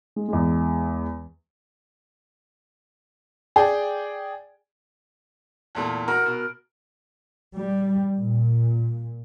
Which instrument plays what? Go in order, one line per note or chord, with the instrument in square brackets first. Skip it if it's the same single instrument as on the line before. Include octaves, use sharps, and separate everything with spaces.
[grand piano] G#3
E2 G#3
[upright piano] G#4 D5 G5
[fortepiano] E2 A#2 A3
[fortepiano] F#4 [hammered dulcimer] A#4
[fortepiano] B2
[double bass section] G3
A#2